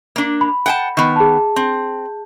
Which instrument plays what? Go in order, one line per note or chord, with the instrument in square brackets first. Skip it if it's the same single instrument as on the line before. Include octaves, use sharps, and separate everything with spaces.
[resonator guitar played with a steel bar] A#3 D4
[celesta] B5
[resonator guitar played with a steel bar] F#5 G5 A5
D#3 B3
[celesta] G#4 A5
[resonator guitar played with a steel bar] C4